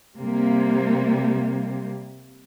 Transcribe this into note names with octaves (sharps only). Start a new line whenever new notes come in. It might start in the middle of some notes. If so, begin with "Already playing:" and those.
C3 G3 A#3